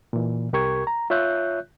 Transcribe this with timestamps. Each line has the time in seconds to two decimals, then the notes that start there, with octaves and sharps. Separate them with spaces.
0.13 A#2 E3
0.53 C2 G4 A#4 C#6 G#6
0.87 A#5
1.10 F4 C#5 E5 F#6 G6